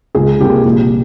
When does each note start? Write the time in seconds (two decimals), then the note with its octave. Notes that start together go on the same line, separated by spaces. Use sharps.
0.15 C#2 G#4
0.39 C3 G3 A#3 G4
0.65 A#1